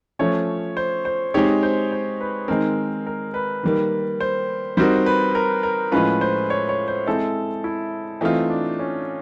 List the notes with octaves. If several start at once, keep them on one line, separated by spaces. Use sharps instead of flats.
F3 A3 C#4 C#5
C5
C5
G#3 C4 D#4 G4 C#5
C5
C5
B4
D#3 G#3 C4 A#4
A#4
B4
D#3 G3 A#3
C5
G3 C4 D#4 F#4 A#4 C5
B4
A#4
A#4
A2 F3 G#3 C#4 F4 B4
C5
C#5
C#5
C5
G#3 C4 E4 A4
E4
E3 A3 C4 D#4 F4
D4
C#4